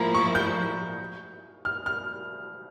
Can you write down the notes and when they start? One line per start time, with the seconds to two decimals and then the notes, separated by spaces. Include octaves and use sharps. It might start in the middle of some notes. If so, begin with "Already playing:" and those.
Already playing: A2 F3 A#3 E4 A#5
0.15 C#6
0.35 G6
1.65 F6
1.86 F6